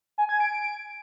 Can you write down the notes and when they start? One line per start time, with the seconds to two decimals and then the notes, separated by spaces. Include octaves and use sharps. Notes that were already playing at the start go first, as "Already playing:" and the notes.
0.18 G#5
0.29 G#6
0.40 D7